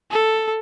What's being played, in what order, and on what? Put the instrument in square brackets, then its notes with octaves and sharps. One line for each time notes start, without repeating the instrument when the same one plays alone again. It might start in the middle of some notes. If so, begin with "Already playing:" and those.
[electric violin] A4